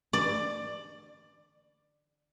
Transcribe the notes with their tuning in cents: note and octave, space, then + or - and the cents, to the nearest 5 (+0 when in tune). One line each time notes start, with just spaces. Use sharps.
D5 +15